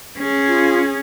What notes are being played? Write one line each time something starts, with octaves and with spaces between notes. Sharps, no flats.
C#4 G#4
F4